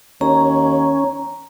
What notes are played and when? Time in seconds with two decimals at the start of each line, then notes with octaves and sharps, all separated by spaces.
0.21 D#2 C#4 A#5